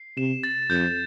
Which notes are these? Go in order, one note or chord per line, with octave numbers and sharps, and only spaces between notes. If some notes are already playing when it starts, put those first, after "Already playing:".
Already playing: C7
C3 E7
A6
F2 G6